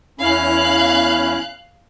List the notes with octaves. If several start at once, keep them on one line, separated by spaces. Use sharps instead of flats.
E2 C#4 E4 F5 F#6